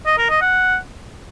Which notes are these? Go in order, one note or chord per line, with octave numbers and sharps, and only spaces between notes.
D#5
A#4
D#5
F#5